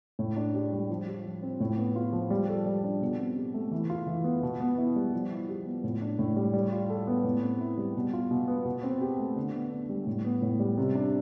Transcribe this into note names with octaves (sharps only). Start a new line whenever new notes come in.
A2
D4
G4
G3
F3
G4
F3
C4
A2
B3
F4
F3
G3
A4
G3
D4
B2
C4
G4
A3
E3
F4
E3
B3
B2
B3
E4
G3
F3
E4
G4
B3
A2
D4
A2
G3
G3
F4
A4
B3
A2
C4
E4
G3
B2
F4
B2
B3
B2
C4
G4
A3
D3
B3
D4
G3
A2
B3
A2
G3
C3
D4